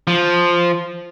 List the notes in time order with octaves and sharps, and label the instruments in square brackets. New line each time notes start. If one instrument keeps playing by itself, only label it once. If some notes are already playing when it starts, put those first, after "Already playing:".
[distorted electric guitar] F3